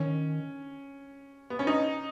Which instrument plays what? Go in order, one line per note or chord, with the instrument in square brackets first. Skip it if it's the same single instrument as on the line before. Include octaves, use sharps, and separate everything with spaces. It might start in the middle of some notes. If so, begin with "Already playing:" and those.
Already playing: [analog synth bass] D#3 [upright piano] C#4
[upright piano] B3
C#4
D#4